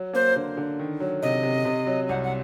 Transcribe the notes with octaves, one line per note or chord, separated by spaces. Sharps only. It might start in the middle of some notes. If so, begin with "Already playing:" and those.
Already playing: F#3
A#3 C5
D3
D3
D#3
F#3
C3 D#5
C3
C3
F#3
C2 F#5
F#5